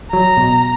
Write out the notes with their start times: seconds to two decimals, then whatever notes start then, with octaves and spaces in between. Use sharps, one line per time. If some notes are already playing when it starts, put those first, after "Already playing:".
0.12 F#3 A#5
0.37 B2